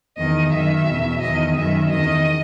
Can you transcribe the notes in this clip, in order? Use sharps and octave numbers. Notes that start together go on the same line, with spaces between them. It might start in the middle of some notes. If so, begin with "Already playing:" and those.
E2 D#3 D#5
F#2 D#3 E5
E2 B2
E2 D#3 D#5
F#2 D#3 E5
E2 D#3 D#5